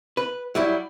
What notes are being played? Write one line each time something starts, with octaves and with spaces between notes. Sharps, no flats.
B4
F#3 G3 E4